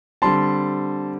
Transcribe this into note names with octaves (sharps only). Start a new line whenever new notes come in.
D3 G3 C4 A5 C6